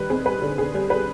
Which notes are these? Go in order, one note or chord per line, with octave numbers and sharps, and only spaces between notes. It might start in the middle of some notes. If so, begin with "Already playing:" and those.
Already playing: D#3 G3 B4
C4 G#4
G3 B4
D3
D3 G#4
G3
G3 B4